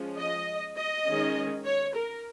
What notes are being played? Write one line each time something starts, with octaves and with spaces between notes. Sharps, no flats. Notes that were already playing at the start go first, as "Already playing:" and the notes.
Already playing: F3 G#3 C#4
D#5
D#5
D#3 G#3 C#4
C#5
A#4